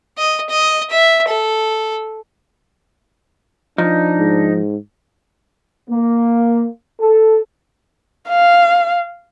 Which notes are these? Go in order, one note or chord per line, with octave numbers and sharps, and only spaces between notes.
D#5
D#5
E5
A4
F3 D4 D#4
G#2
A#3
A4
F5